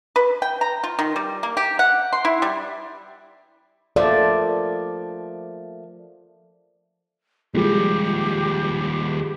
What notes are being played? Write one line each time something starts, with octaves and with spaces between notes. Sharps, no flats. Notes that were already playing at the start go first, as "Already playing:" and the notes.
B4
G5
A#5
F4
D#3
G3
A#3
G4
F#5
C6
E4
G3
F3 A3 A#3 D5
D#2 F3 G3 G#3 G4